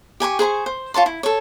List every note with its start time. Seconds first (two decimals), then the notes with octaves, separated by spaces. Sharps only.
0.20 G4 G#5 B5 C#6
0.39 G#4 C5 B5 C#6
0.66 C5
0.94 F4 C#5 A5 C6
1.06 E4
1.23 A4 C#5